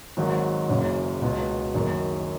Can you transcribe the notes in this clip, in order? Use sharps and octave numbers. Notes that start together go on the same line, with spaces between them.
G#1 G#2 D#3 F#3
F#1 F#2 C#3
C#2 B2 B3
F#1 F#2 D#3